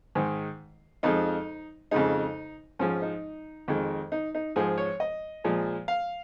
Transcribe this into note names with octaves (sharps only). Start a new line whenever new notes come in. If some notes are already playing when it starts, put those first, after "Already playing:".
G#2 D#3 G#3
F2 F3 G#3 D#4
F2 C#3 G#3 D#4
G#2 F3 G#3 C#4
D#4
F2 D#3 G#3
D#4
D#4
G#2 F3 G#3 G#4
C#5
D#5
A#2 F3 G#3
F5